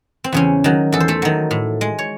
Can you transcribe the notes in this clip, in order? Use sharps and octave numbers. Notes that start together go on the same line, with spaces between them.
C4
E2 C#3 C#4
D#3 F#3
E2 A4
C5
A3 A4
D#3 F#3
A2
G#3
C#5